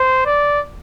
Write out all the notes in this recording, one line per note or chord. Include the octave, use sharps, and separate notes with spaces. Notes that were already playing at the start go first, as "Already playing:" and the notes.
Already playing: C5
D5